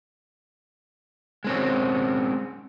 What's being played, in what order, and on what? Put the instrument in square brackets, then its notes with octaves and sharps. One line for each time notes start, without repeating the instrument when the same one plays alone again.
[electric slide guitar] G#3 C4 C#4